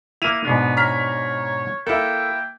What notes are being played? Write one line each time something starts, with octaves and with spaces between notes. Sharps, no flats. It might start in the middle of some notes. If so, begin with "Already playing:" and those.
A#3 E4 D#7 F7
G#2 B2 B3 D4
C#5 A#5 F6 B6
A#3 E4 A4 G5